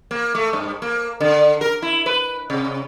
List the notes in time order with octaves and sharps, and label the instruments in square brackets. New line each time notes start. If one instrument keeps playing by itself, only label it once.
[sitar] A#3
A3
G2
A#3
D3
A#4
E4
B4
C3